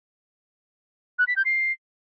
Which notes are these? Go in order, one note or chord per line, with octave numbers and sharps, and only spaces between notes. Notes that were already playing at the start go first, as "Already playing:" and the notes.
F#6
B6
G6
C7